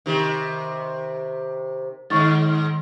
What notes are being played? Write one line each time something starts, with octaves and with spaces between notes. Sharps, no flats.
C3 D#3
G#2 D#3 C#6 A6